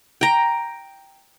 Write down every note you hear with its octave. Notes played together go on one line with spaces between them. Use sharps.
G5 A#5